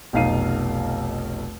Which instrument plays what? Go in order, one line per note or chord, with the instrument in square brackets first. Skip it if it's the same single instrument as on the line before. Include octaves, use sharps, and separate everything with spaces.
[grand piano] F1 B1 D#4 F5 C7 D#7